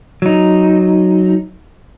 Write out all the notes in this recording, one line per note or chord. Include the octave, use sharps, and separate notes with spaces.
F#3 D#4